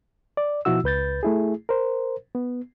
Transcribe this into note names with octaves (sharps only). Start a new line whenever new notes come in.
D5
B2 F3 E4 F#4 E6
C#2 B4 G6 A6
A3 E4 G#4
A#4 C5
B3